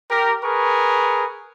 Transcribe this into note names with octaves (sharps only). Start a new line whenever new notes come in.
G4 A#4
G#4 A#4 B4 C#6